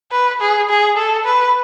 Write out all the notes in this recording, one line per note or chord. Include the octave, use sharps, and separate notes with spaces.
B4
G#4
G#4
A4
B4